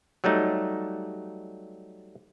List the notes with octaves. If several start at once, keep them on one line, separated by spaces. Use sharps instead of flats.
F#3 G3 A3 D#4